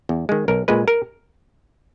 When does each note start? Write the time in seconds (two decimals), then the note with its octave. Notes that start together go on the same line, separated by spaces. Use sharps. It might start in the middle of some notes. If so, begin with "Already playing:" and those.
0.09 E2
0.29 D#3 G#3
0.48 B1 A#4
0.68 A#2 G#3 B4
0.88 A#4